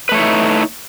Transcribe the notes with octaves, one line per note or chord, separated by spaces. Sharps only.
A3 D#4 E4 B4 C#5